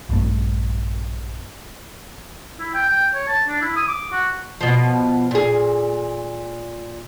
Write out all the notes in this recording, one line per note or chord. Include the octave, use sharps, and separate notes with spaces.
A#1 G2 A3
E4
G5
G5
C#5
A5
D4
E4
D#6
D6
F#4
B2 F3
A#2 G#4